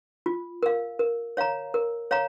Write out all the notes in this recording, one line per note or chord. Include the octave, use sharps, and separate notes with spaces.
F4
A#4 F5
A#4
C#5 F5 A#5
A#4
C#5 F5 A#5